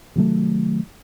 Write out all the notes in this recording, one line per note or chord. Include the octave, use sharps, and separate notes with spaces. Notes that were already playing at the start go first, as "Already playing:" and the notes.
C3 D#3 F#3 A3